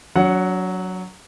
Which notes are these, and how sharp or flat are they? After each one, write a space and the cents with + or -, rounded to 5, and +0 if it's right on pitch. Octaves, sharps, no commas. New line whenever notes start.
F#3 +0 D4 -45 F#5 +0